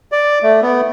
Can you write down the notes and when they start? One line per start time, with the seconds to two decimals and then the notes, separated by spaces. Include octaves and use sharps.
0.12 D5
0.43 A3
0.62 B3